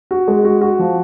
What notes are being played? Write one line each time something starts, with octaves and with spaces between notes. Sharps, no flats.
F#4
G#3
F#4
F#4
F3